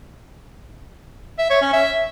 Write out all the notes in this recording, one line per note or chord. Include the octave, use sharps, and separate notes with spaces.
E5
C#5
C#4
E5